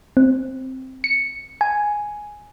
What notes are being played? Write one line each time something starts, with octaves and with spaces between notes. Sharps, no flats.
C4
C#7
G#5